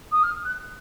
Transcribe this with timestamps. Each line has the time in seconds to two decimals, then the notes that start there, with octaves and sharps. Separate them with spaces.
0.12 D#6
0.23 F6
0.45 F#6